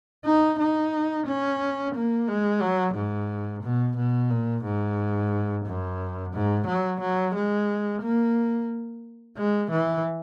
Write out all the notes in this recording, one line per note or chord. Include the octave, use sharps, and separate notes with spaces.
D#4
D#4
C#4
A#3
G#3
F#3
G#2
B2
B2
A#2
G#2
F#2
G#2
F#3
F#3
G#3
A#3
G#3
E3